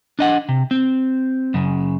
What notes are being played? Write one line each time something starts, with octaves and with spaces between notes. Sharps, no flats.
D4 D#5 F#5
C3
C4
F#2 C#3